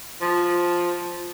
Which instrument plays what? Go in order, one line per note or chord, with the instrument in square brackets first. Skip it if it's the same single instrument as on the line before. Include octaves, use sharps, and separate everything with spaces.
[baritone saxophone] F3